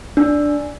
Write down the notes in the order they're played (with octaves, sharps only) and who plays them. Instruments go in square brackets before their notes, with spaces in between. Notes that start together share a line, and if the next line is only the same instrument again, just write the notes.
[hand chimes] D4